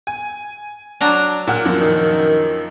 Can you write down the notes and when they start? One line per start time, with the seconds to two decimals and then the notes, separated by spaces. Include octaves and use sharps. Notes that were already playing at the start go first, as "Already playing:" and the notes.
0.07 G#5
1.01 F#3 D4 A#5
1.47 A#2 F#5 F6
1.65 F#2 F3 A#3
1.80 D#3